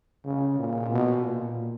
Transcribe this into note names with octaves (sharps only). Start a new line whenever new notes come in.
C#3
A#2
B2
A#2